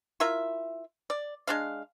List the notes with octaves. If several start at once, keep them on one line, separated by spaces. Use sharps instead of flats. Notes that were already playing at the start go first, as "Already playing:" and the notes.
E4 F4 A#4 E5
D5
G#3 D4 F5